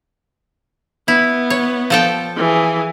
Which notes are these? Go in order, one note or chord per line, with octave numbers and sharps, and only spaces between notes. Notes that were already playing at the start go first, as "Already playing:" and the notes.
B3 E4
C#5
F3 A4 G5
E3 G#4